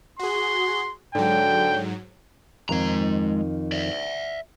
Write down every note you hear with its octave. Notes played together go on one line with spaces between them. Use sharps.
F#4 G#4 C6
G#2 D3 F#3 G5
F2 D#3 G#3 A#5
D5 E5